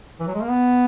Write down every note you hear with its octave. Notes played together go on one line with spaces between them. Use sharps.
E3
F#3
G#3
A#3
B3